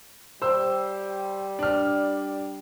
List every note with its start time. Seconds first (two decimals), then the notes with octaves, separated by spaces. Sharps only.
0.42 G3 C5 E6
1.59 D4 F6